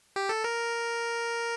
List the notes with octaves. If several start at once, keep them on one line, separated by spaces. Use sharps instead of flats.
G4
A4
A#4